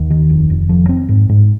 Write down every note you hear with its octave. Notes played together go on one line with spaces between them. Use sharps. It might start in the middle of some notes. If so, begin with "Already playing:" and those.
Already playing: D#2
D#3
F1
F1
F3
C4
G#2
G#2